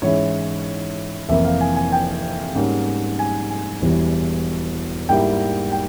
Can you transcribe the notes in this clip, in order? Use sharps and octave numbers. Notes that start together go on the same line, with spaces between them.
G#2 E3 G#3 C#4 E4 C#5
F1 F2 E3 A#3 E4 E5
F5
G#5
G#5
G5
G#2 G3 A#3 C#4
G#5
G#5
E1 E2 E3 G3
G#2 G3 A#3 E4 G5
G5